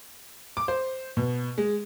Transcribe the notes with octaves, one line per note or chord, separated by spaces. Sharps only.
D6
C5
B2
G#3